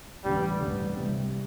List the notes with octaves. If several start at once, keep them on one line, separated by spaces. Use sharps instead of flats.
A1 G2 D3 G3
A1 G2 D3
C2 C3 G3